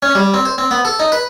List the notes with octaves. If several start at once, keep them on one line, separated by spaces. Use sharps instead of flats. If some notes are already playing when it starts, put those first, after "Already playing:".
C#4
G3
C4
C5
C4
B3
A4
D#4
B4